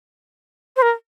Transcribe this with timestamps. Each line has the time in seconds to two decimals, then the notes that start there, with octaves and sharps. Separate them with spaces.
0.76 C5
0.82 A#4